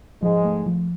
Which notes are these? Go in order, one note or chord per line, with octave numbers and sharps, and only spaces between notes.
G#2 F3 G#3
A3
F3